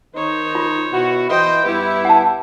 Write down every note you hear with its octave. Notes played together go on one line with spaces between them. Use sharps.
D#3 D#4 C5 C#5
F4
B2 E4 F#4
E3 E4 C5 D#5 G5
G2 B3 E4 G4
F#5 A5